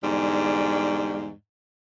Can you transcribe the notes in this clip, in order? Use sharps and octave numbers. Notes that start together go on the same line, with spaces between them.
E2 G#2 D3 G3